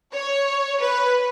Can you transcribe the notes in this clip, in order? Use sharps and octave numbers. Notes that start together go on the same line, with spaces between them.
C#5
B4